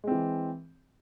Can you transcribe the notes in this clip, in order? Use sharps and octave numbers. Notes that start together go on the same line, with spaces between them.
E3 G#3 C4